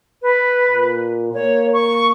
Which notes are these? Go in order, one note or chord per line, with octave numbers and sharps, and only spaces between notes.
B4
A#2
A#3 C#5
C#6